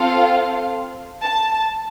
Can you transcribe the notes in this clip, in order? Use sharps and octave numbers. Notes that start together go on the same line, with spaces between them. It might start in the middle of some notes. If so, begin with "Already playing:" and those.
Already playing: C4 F4 A4 F5
A5